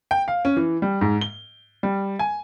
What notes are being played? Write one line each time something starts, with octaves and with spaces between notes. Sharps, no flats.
G5
F5
C#4
E3
G3
G#2
G7
G3
G#5